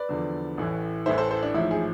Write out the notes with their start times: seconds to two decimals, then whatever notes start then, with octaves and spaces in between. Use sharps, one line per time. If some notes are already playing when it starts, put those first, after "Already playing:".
Already playing: B4 D5
0.09 E2 D3 F3
0.58 A1 A2 E3
1.06 A1 A2 E3 C5 E5
1.18 A4 C5
1.30 A4 C5
1.43 D4
1.54 A1 G#2 F3 E4
1.71 E4 G#4